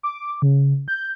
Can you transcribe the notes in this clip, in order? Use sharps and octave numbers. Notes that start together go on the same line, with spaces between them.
D6
C#3
G6